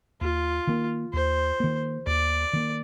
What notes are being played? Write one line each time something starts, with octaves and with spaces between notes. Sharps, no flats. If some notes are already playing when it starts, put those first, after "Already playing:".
D#2 F4
D#3 A#3
D#2 C5
D#3 A#3
D#2 D5
D#3 A#3